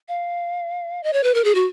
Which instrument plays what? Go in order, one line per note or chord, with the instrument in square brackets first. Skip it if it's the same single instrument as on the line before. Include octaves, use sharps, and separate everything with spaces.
[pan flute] F5
D#5
C#5
B4
A#4
G#4
F#4